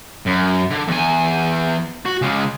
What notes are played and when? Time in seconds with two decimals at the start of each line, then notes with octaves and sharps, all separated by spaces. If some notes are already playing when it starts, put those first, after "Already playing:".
0.26 F#2
0.70 D3
0.88 E2 G#5
2.06 F#4
2.22 C#3 G#3